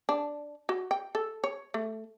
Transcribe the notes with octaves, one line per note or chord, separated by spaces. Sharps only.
D4
F#4
G5
A4
C#5
A3